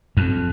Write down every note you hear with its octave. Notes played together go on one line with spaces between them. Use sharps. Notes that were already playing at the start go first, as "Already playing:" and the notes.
F2